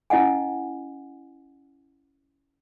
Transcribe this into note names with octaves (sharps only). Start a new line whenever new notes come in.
C#4 E4 D#5 F#5 G#5